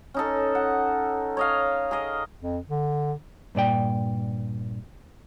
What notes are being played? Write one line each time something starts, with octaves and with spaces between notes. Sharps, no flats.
C#4 D#4 A4
F#5
C#5 D#5 F5
G#4 A#4 D#5
F2
D3
G2 A#2 D5 G5